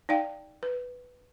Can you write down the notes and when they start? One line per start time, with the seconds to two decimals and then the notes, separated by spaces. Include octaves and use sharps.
0.09 D#4 D5 F5 G5
0.63 B4